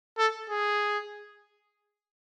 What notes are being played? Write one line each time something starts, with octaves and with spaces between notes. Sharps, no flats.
A4
G#4